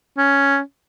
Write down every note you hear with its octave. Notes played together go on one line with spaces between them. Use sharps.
C#4